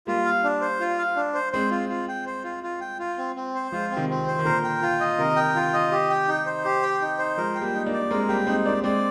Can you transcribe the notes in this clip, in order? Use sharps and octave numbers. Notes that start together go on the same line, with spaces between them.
G3 A#3 F4
F5
D4
C5
F4
F5
D4
C5
G#3 C4 C5
F4
F4
G5
C5
F4
F4
G5
F4
C4
C4
C5
F3 G#3 F4
C4
C3 D#3
C4
C5
D#3
A#2 D3 A#4
G5
F4
D#5
C3 D#3 A#4
G5
F4
D#5
G4
G5
D#4
C5
G4
G5
D#4
C5
F3 G#3 A#4
G5
G3 A#3
D#4
A#3 D4
D5
G#3 C4 A#4
G3 A#3 G5
G#3 C4 D#4
A#3 D4 D5
G#3 C4 D5